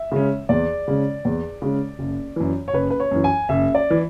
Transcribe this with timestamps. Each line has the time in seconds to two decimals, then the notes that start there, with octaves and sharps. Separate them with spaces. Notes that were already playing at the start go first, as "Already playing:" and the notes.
Already playing: E5
0.12 C#3 G#3 C#4
0.49 E2 D5
0.88 C#3 G#3 C#4
1.25 E2
1.62 C#3 G#3 C#4
1.99 F#1
2.36 F#2 E3
2.68 C#5
2.74 F#1 B4
2.91 B4
3.00 C#5
3.11 F#2 E3
3.24 G#5
3.49 F#1 E5
3.75 D5
3.90 E3